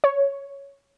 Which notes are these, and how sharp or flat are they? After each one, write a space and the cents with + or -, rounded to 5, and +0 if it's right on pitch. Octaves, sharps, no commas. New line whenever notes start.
C#5 +5